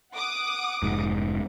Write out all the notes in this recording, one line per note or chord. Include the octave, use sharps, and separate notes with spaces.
F#5 D6 D#6
F1 G#2